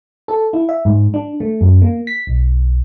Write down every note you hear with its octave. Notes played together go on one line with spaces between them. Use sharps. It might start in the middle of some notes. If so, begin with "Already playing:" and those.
A4
E4
E5
G#2
D4
A3
F#2
A#3
B6
B1